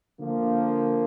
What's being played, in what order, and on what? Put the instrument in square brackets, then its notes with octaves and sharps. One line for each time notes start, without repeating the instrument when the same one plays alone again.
[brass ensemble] D3 F3 A#3